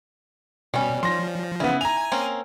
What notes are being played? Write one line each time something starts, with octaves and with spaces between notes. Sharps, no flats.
B2 G3 C#4
F3 C6 A#6
C#3 B3 E4
G#5 A#5 F7
A#3 C4 C#4